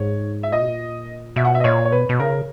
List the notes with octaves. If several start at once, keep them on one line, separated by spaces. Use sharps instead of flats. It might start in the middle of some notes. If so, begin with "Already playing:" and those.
Already playing: G#2 C#5
E5
A#2 D#5
B2
A#2
B2 E5
F#5
E5
D#5
A#2 C#5
C#5
B2 B4
B2
C#3 A#4